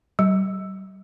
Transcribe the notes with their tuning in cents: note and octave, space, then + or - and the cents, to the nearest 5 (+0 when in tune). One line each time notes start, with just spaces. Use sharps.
G3 -35